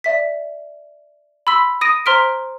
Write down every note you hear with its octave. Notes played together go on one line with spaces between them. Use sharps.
D5 E5 B6
B5 C6 E6 B6
D#6 A#6 D7 D#7
C5 A#5 C6 F6 B6 D7